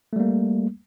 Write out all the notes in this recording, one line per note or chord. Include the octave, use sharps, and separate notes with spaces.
G3 A3 A#3